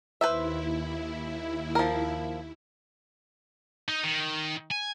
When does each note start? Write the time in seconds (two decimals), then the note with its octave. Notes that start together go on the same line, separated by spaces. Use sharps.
0.21 D#2 E4 B4 C5 E5
1.75 F3 A#4
3.89 D#4
4.04 D#3
4.71 G#5